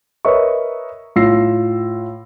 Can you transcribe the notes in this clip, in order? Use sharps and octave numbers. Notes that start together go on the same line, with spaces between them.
A#4 B4 C#5 D#5 E5 C#6
A2 F4 E6 A#6 C7